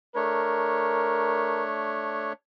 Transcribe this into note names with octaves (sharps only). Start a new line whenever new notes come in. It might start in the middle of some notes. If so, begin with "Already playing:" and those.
A3 D4 A#4 C#5